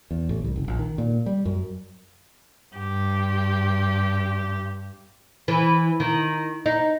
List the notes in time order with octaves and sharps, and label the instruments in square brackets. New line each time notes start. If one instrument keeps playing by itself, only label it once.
[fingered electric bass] E2
A1
C2
F#1
A#1
D#3
A#2
G3
F#2
[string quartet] G2 G4
[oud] E3
D#3
D#4